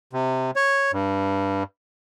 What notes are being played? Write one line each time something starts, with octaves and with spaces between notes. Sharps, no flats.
C3
C#5
G2